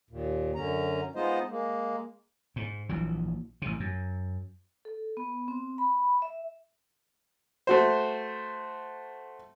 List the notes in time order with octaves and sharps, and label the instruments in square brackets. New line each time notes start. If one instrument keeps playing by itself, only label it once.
[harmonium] D#2 A#2
F#2 D3 C#4 A#5
G#3 B3 D#4 F4 C5 D#5
G#3 A#3
[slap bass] G#2
A#1 E3 F#3
A1 C3
F#2
[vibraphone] A4
B3
C4
B5
E5
[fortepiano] A3 F#4 C5